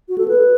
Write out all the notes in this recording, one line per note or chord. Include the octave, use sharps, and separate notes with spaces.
F#4
A4
B4